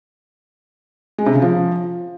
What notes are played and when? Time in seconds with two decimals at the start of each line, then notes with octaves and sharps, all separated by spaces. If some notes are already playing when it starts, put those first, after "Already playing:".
1.18 G#3
1.26 C3
1.34 C#3
1.42 F3